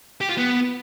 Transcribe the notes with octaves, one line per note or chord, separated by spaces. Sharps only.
G4
F4
B3